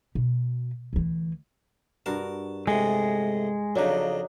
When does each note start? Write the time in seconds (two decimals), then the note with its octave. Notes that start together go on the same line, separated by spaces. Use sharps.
0.15 B2
0.93 D2 E3
2.06 G2 F#4 A#4 A5
2.67 A2 C3 G#3
3.76 F2 C#3 F#3 D4 D#4